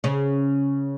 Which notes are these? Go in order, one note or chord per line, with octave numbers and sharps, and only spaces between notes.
C#3 C#4